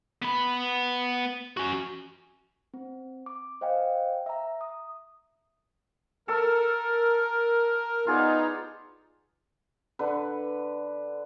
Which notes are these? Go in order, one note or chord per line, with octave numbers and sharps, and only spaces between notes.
B3 B5
C#4 F#4
C4
D6
C5 D#5 F5 G5 G#5
E5 A#5
D#6
A4 A#4 E6
B3 D#4 F4 G#4 D5
D3 B4